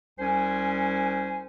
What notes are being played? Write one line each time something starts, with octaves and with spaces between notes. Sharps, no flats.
C2 C#4 C5 G#5